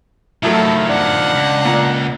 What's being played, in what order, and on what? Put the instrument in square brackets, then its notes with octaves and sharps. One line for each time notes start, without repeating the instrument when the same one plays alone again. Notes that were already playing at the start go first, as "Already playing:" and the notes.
[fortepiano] A2 F#3 A3 [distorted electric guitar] D#3 F3 [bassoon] E4 [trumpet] A4
[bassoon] D4 [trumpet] F#5
[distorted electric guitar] C#2
[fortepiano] A#2 A#5